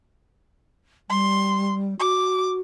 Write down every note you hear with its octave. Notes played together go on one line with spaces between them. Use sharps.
G3 C6
F#4 D6